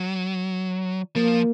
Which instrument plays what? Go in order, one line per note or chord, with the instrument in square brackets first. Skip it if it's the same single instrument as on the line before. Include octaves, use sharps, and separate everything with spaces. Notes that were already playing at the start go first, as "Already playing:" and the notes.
Already playing: [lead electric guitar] F#3
[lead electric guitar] F3 [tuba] A#3